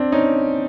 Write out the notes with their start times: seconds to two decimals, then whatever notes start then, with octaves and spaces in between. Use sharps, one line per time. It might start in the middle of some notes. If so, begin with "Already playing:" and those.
Already playing: C4 D4
0.12 C#4 D#4